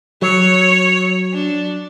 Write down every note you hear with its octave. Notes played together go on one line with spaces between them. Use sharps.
F#3 C#5
D4